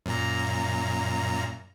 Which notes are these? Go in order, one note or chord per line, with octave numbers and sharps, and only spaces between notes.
F#2 A#2 A#5